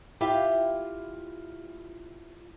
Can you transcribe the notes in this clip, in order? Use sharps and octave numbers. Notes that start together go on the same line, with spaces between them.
E4 F4 G4 E5 F5